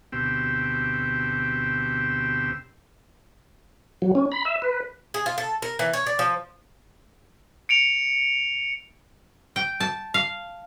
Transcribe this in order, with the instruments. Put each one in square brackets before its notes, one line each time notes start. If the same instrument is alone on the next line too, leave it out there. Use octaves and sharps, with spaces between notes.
[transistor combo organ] D2 B2 C4 G4 G5 E6
[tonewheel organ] F#3
C#4
B5
E5
B4
[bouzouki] G#4
F4
A4
A#4
E3
C#5
D5
F3
[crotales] C#7 D7 F7
[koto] G5
A5
F5